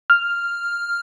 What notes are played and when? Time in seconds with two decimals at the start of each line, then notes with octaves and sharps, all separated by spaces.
0.10 F6